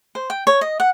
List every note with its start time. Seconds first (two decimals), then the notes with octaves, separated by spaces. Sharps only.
0.15 C5
0.30 G5
0.47 C#5
0.61 D#5
0.80 F#5